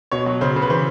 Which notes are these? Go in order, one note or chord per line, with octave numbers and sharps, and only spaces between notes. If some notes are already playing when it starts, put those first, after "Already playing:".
B2 C#5
F#3
C#3 C5
C#3
B4
E3 C5